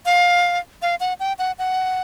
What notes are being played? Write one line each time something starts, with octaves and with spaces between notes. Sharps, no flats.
F5
F5
F#5
G5
F#5
F#5